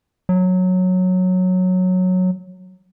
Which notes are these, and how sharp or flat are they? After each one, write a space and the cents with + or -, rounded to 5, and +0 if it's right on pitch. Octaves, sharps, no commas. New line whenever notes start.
F#3 -10